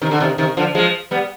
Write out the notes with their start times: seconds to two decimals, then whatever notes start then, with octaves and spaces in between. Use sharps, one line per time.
0.01 C3 D#3
0.11 D3
0.20 C3 D#3
0.38 C3 D#3
0.57 D3 F3
0.75 F3 G#3
1.11 G3 B3